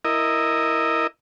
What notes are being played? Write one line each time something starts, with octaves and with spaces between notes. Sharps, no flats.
E4 A#4 D#5